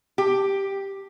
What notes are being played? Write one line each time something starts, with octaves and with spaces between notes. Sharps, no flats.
G4